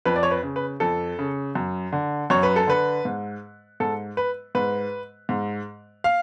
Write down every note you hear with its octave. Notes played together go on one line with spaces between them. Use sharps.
F2 B4
D5
C#5
B4
C#3
B4
F2 A4
C#3
F#2
D3
F#2 C#5
B4
A4
D3 B4
G#2
G#2 A4
B4
G#2 B4
G#2
F5